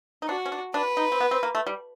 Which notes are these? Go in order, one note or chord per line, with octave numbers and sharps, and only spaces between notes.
D#4
D4 F#4
C#4
D4
D4 B4
D#4
C4
B3
C4
A#3
A3
G3